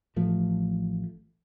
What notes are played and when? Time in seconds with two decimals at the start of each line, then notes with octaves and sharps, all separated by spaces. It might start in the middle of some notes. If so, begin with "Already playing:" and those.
0.16 A1 F3 A3